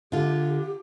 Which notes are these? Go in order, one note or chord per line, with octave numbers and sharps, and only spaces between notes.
D3 F4 G4